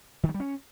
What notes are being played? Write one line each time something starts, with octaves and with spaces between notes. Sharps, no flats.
D#3
F#3
G3
C#4